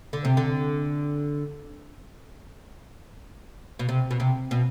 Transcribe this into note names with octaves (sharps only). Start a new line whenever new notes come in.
D3
C3
D3
B2
C3
B2
C3
B2